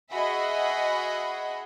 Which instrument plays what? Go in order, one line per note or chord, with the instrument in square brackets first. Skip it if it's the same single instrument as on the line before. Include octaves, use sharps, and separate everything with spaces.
[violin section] F#4 G#4 D#5 E5 F#5 B5